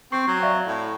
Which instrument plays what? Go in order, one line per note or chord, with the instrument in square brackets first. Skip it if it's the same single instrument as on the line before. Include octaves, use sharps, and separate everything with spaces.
[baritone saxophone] C4 [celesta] C#6 C7
[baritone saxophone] F#3
[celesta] D5 E5 F5
[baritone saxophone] A2